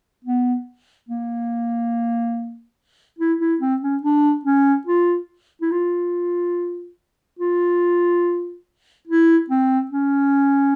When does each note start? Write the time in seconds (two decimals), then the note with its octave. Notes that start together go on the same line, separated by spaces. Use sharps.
0.25 B3
1.09 A#3
3.19 E4
3.40 E4
3.61 C4
3.82 C#4
4.03 D4
4.45 C#4
4.87 F4
5.62 E4
5.72 F4
7.39 F4
9.08 E4
9.50 C4
9.91 C#4